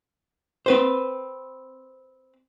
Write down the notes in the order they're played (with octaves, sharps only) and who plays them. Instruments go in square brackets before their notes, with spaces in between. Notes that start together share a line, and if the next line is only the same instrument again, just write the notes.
[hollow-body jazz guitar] C4 B4 C5